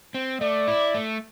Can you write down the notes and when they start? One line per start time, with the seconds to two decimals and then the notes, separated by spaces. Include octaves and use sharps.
0.14 C4
0.41 A3 D5
0.68 E4
0.94 A3